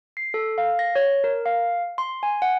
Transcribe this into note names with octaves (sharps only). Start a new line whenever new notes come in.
C7
A4
F5
A#6
C#5
A#4
F5
C6
G#5
F#5